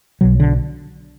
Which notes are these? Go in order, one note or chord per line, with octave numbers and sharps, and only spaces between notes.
B1 B2 F#3
D3